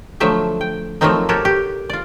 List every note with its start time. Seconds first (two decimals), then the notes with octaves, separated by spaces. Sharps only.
0.20 D3 F3 F#3 A3 E5 G5
0.61 G5
1.01 F3 F#3 A3 A#3 C4 D#4
1.29 F#4 G4 A4 A#4 C#5
1.45 G4
1.90 F4 D5